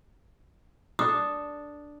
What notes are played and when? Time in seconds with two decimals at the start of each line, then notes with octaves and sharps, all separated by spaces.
0.99 D4 A4 D#6